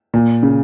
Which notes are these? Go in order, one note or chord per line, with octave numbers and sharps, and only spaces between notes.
A#2
C#3